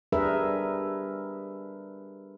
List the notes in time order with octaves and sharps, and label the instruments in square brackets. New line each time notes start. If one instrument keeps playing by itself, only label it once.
[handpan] G3 D4 G#4 A#4 B4 E5